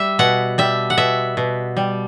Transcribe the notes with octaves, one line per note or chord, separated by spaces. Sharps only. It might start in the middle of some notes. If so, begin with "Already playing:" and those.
Already playing: G3 E5
B2 F#5
G3 E5
F#5
B2 E5
B2
G3